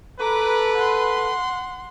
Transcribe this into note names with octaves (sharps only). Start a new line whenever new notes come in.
A4 B4 A#5 D6
F#5 C6